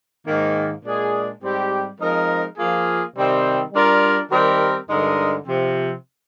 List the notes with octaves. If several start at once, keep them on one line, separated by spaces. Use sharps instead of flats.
G#2 D#3 A#3
A#2 G#3 D4 G#4
G#2 G3 C4 G4
F3 G#3 C4 D#4 A#4
F3 A#3 F4 G#4
C3 D#3 G3 C4
G3 D4 F4 A#4
D#3 G3 C4 G4 A#4
G2 D3 G#3 D#4 A#4
C3 F3 C4